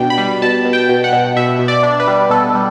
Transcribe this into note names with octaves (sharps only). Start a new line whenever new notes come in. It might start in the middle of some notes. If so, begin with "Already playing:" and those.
Already playing: B2 D4 G5
B5
G3
B2 A5
B2
G5
B2
F#5
B2
B2 E5
B2
D5
D4
B4
G3
B2 A4
G3